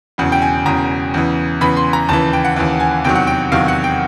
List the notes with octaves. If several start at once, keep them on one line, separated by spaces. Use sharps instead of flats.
E1 E2 C#3
G5
G#5
E1 E2 C#3 A#5
E2 C#3 E3
E2 C#3 E3 B5
C6
A#5
D#2 C#3 E3 A5
G5
F#5
D#2 C#3 E3
G#5
E2 C3 D#3 F#3 G5
F#5
G5
E2 C3 D#3 F#3 F5
F#5
G5